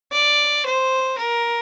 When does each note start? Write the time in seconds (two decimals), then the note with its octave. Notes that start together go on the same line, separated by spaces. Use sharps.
0.12 D5
0.65 C5
1.17 A#4